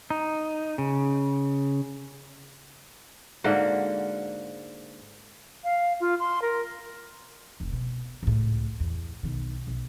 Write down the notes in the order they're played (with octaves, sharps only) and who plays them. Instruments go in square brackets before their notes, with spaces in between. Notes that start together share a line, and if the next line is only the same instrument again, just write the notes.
[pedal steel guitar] D#4
C#3
[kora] G#2 D3 A#3 F#4
[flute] F5
F4
C6
A#4
[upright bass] F1
B2
C#2 A2
E2
B1 D#3
B1